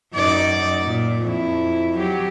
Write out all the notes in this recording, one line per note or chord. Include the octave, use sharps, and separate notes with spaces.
F#2 D#4 D5
A#2
F2 E4
F#3 G4